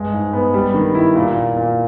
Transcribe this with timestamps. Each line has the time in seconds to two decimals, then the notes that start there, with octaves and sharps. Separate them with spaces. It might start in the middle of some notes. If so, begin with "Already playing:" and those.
Already playing: G2 G#3
0.13 G#2
0.33 B3
0.54 G3
0.74 D#3
0.95 E4
1.15 A#2
1.35 A#2
1.56 A#2